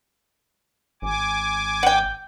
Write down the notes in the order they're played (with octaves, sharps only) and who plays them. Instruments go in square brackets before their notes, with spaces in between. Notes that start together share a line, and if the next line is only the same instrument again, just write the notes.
[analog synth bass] G#1 [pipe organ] G#5 D6
[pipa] F#5 G5